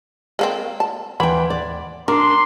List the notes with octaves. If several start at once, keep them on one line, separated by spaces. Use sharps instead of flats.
G#3 A#3 C4
A5
D#2 E3 F#5 G5 B5 C6
D5
D4 A#4 A#5 C6 D6